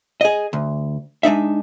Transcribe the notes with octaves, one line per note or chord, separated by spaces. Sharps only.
G#4 D#5
D2
G#3 D4 D#4 E5